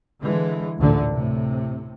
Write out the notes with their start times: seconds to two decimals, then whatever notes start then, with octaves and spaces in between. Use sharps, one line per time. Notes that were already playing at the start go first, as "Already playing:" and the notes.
0.21 D3 E3 G#3
0.78 A1 D2 A#2 D3
1.11 A2 C3